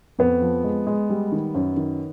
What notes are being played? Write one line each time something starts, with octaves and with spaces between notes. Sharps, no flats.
F2 B3
F3
G#3
G#3
G3
D#3
F#2
D#3